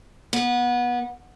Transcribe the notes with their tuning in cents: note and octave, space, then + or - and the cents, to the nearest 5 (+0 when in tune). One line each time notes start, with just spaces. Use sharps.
B3 -25